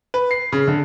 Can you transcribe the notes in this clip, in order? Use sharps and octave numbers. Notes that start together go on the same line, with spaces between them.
B4
C7
C#3
D3